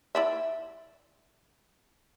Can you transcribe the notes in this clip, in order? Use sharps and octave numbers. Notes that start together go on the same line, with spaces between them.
E4 D5 E5